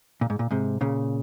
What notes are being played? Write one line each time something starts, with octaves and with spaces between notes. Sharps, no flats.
A#2
G#2
A#2
G#2 C3
A#2 C#3